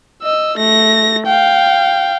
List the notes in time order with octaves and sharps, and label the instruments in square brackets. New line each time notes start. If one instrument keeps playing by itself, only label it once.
[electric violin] D#5 E6
A3 A#6
F5 G5